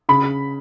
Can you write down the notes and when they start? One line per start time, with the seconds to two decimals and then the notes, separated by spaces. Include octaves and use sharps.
0.09 C#3 B5